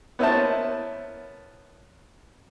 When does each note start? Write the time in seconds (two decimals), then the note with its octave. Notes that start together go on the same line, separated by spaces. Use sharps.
0.19 B3 C#4 E4 A#4 C5 A5